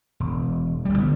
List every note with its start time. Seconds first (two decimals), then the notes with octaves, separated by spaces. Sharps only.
0.20 E1
0.85 A1 G3
0.98 D3 B3